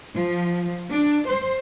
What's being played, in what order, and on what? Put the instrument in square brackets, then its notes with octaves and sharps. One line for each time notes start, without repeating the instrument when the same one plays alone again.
[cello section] F3
D4
C5